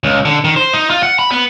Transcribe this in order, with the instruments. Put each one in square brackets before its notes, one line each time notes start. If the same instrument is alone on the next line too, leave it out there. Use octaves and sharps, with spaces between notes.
[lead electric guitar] C#2
D3
D#3
C5
D#4
F4
F#5
B5
B3